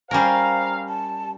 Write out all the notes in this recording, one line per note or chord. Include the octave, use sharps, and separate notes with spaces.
G3 C#4 A#4 C5 F5 A#5
A5